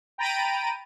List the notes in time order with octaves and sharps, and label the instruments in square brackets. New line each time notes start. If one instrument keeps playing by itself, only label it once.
[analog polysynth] G5 A#5 B5 A6 D7 D#7